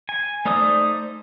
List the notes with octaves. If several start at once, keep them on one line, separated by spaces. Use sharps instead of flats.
G#5
A3 D#4 C5 D5 D#6